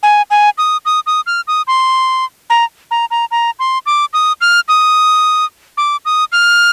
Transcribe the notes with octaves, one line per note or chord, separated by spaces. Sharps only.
G#5
G#5
D#6
D#6
D#6
F6
D#6
C6
A#5
A#5
A#5
A#5
C6
D6
D#6
F6
D#6
D6
D#6
F6